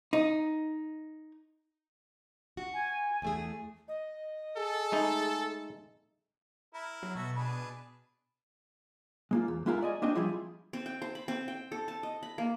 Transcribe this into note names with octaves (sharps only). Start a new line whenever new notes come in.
D#4
F#4
G#5
E2 A3 G#4
D#5
G#4 A4
G#3 A3 D#4
E4 A#4
F#3
B2 F#4 A4 E5
D4 G#4 B4
G#3 A#3 F4
E2
G#3 B3 E4 F4 G4 A#4
D5 D#5 G#5
A#3 C4 D4 F#4 D#5 G5
F3 G3 E4 F4 G#4
C4
G5
C5
B5
C4
G5
A4
A5
D#5
B5
A#3